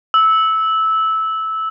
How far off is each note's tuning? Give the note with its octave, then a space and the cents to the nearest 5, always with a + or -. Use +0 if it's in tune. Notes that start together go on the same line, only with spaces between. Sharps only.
E6 -15